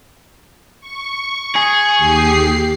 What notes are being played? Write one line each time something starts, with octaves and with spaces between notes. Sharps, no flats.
C#6
G#4
D#2 G4 C7